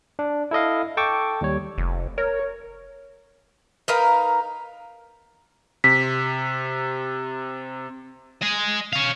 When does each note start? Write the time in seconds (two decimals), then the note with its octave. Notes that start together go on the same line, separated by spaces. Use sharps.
0.19 D4
0.51 E4 A4 D#5 F5
0.97 A4 G5 A5 C#6 D6
1.41 D#2 G3 C#5
1.78 F1
2.18 A#4 C#5
3.88 D#4 A#4 B4 F5
5.84 C3 B6
8.42 D#5 G#5
8.93 C#5 F5